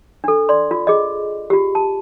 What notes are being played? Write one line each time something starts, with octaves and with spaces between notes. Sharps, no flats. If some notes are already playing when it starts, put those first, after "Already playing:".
D4 A4
D5 C6
F4
G#4 D#5
F4 G4
A5